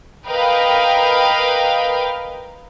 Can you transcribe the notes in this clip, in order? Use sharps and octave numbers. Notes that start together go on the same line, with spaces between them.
A#4 B4 D#5 F5 G5